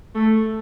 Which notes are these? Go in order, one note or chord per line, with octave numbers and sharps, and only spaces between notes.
A3